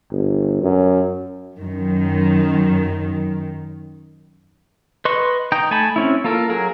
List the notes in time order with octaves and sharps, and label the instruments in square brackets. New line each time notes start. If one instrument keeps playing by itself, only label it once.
[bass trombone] G1
F#2
[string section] F#2 D#3
[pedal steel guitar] B4 D#5 C6 C#6
D#4 G5
A3 G#5 A5 B5
C4 C#4 E4
A#3 F4 A4 A#4
F#3 G#4 A#4